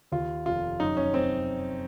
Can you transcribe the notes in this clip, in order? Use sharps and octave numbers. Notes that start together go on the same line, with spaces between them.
D#2 F4
F1 F4
F#2 D#4
C#4
C4